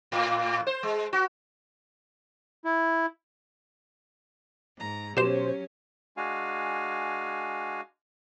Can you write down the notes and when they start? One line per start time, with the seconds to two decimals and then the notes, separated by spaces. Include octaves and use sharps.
0.12 A2
0.67 C5
0.83 G#3
1.13 F#4
2.65 E4
4.77 G#2 A#5
5.17 B2 F#3 C#4 G4 C5 E7
6.17 G#3 D4 F#4 F5 G#5